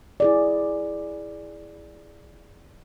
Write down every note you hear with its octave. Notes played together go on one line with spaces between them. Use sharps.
E4 G#4 D5